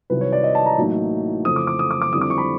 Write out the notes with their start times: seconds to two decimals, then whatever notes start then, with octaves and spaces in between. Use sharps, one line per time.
0.10 C2 C3 D#3 F#3 B4
0.21 C#5
0.32 D5
0.44 D#5
0.55 A5
0.66 A#5
0.77 A1 A2 F#3 A#3 D#4
1.45 F2 C#3 E3 A3 D#6
1.56 D6
1.67 D6
1.79 D#6
1.91 D6
2.02 D6
2.13 F2 D3 G3 C4 E4 D#6
2.21 D6
2.30 C#6
2.38 B5